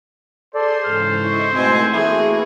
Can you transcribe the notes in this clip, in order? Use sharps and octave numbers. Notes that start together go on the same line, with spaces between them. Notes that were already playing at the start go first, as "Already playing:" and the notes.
G#4 A4 C5 D5 C6
G#2 C#3 E3 A4 F6
E4 D#5 E5 C#6
G#2 B2 A3 C4 F#5 G#5
E3 A3 A#3 E4 F#4 G#4